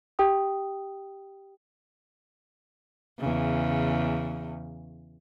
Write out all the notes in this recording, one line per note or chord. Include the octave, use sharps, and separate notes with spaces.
G4 G5 D#6
E2 C#3